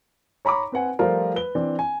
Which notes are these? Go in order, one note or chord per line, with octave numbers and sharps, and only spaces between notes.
C#5 A#5 B5 C#6 D6
C4 B4 F#5 G#5
F3 G3 A3 F4 A#4 C5
B4 G7
E3 C4 D4
G#5